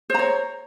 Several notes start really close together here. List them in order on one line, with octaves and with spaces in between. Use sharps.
C5 A#5 C#5